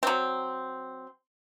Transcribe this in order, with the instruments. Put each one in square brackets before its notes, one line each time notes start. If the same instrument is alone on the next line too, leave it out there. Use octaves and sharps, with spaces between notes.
[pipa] F#3 C4